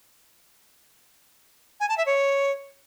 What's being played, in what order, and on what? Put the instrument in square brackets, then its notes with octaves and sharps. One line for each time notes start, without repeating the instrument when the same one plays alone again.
[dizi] G#5
A5
E5
C#5